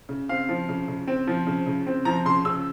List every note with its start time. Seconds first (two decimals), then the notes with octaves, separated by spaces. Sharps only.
0.09 C#3
0.29 C4 F5
0.49 F3
0.69 C#3
0.88 C#3
1.07 C4
1.27 F3
1.47 C#3
1.67 C#3
1.87 C4
2.05 F3 A#5
2.25 C#3 C6
2.45 C#3 E6